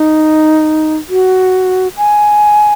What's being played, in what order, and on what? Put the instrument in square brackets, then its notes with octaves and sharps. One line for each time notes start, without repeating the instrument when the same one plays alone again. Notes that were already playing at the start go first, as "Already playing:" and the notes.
Already playing: [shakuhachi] D#4
F#4
G#5